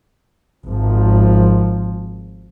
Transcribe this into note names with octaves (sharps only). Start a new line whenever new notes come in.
G#1 F3